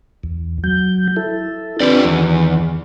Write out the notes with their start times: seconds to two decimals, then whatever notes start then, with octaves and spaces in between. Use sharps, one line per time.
0.24 E2
0.64 F#3 G6
1.16 E4 A4
1.80 C4 D4 F4 G4 B4 D5
2.04 E2 D#3